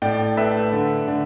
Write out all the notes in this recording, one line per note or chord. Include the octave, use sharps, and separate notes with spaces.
A2 D5 G5
A3 B4 E5
D3
D3